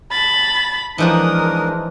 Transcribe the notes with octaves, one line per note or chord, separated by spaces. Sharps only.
A5 B5 A6
E3 F3 G#3 D4 D#4 F#4 A#4 D#6